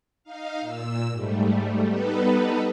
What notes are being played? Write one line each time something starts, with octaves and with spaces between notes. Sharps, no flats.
D#4 F5
A#2 E6
G#2 G3 A3
G3 B3 D#4 A4 B4